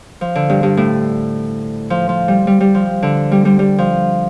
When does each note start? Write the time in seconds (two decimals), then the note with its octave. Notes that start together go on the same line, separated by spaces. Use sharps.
0.21 F3
0.35 D3
0.50 G2
0.63 G2
0.77 A2
1.90 F3
2.09 F3
2.28 G3
2.47 G3
2.61 G3
2.75 F3
3.03 D3
3.32 G3
3.45 G3
3.59 G3
3.78 F3